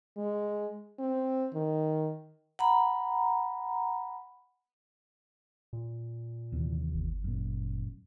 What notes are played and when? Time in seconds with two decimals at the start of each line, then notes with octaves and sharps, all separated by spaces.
0.17 G#3
0.99 C4
1.54 D#3
2.59 F#5 A#5 B5
5.73 A#2
6.52 D#2 C3 E3
6.94 G1
7.24 F#2 A#2